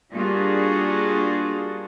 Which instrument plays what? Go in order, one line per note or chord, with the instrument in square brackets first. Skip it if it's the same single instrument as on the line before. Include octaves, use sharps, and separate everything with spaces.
[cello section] G3 A#3 D4 F4 F#4 G#4